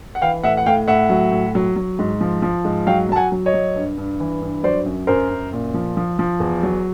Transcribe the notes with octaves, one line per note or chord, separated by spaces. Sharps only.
F#5
E3 F5 G5
A2 E5 F#5
F#5
A2 F5 G5
A2 E5 F#5
F#3
A2
F#3
F#3
G#2
F3
F3
G#2
F#3 F5 G5
F#3 A5
F#5 G#5
F#3
C#5 D#5
F#3
G2
G2
E3
G2
F#3 C5 D5
F#2
F#2 A#4 C5
F#2
A#2
F3
F3
F3
E2
F#3